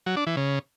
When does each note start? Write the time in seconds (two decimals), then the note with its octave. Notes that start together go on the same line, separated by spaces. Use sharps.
0.06 F#3
0.16 D4
0.27 E3
0.37 C#3